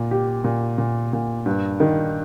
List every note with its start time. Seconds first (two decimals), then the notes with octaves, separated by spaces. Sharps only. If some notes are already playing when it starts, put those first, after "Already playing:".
Already playing: A#2
0.11 G4
0.44 A#2
0.78 A#2
1.13 A#2
1.46 G2
1.80 D#3